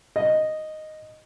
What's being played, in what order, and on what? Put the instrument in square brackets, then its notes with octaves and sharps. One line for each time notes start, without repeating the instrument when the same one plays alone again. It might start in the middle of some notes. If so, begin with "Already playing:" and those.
[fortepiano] D#5